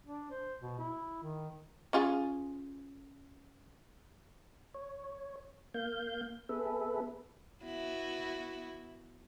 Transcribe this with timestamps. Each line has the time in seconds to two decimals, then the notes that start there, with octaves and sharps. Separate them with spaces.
0.05 D4
0.31 C5
0.61 B2
0.79 E4
1.23 D#3
1.93 C#4 F4 G#4
4.74 C#5
5.74 A#3 F5 G6
6.49 B3 G#4 A4 B4 E5
7.64 B3 E4 F#4